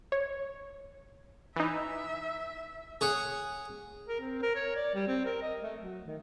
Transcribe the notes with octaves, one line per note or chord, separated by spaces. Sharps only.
C#5
E3 D#4 E5
G#4 C#5 F#5
A#4
C4
A#4
C#5
D5
G3
C4
A#4
D#5
A3
F#3
D#3